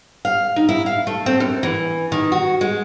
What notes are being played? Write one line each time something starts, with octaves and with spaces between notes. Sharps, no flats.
F5
D#4
E4
F5
A3
C4
F#2
E3
D#3
F#4
G#3